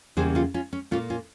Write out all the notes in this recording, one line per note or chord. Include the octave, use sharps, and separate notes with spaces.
E2 C#3 G3 A#3 G#4 C5
C#4 F4
C#4 F4
C#4
A#2 G3 A#3 C#4 F4
C#4 F4